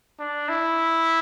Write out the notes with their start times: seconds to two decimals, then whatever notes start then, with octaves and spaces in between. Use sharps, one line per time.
0.19 D4
0.49 E4